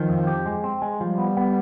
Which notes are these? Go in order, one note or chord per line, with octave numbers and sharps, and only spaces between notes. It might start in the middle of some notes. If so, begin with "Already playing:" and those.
Already playing: D#3 F3
F2
G4
G#3
C4
G#3
F3 G3
B3
B3